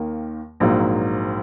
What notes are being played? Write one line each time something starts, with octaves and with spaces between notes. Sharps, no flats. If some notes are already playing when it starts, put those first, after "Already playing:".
Already playing: D#2 D#3 A#3
A#1 G#2 F#3 A#3